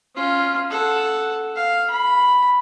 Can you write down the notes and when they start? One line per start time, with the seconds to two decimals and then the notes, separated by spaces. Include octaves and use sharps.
0.15 C#4 F4
0.70 A4 F#5
1.56 F5
1.90 B5